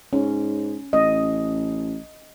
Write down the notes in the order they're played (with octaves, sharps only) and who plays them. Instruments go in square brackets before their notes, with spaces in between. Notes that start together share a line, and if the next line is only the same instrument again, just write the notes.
[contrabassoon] G#2 [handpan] C#4
[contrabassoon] A1 [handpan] D#5